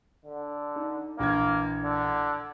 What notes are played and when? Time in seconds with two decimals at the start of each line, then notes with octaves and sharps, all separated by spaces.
0.26 D3
0.76 D#4
1.19 A#1 E3 A#3 G#6
1.85 D3